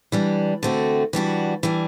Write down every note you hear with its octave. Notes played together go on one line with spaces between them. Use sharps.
E3 G3 D4
D3 A3 C4 F#4
E3 G3 D4 F#4
E3 G3 D4